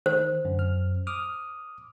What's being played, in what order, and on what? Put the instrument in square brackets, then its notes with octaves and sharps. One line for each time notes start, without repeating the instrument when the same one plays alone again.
[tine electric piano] D#3 [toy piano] C5
[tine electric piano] F#2 D3
F#2 F6
D6 D#6 F6